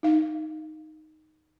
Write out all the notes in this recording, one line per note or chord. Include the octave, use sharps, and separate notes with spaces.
D#4 F5